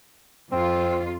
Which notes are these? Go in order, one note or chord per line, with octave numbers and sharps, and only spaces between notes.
F2 C4 F4